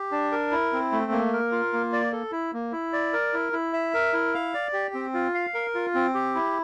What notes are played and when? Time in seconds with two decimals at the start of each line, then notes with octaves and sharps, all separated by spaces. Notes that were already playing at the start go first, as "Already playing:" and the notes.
Already playing: G4
0.12 D4
0.32 A#4
0.51 E4
0.73 C4
0.92 A3
1.12 A#3
1.33 A#4
1.52 F4
1.73 A#3
1.93 D5
2.12 A4
2.32 E4
2.53 A#3
2.72 E4
2.93 D5
3.13 A#4
3.34 E4
3.53 E4
3.73 E5
3.94 A#4
4.13 E4
4.34 F5
4.54 D5
4.73 G4
4.94 C4
5.14 F4
5.34 F5
5.54 A#4
5.75 F4
5.95 C4
6.14 G4
6.35 E4